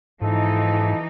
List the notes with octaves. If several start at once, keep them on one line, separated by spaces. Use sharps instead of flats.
B1 G#2 E3 F3 D#4 A4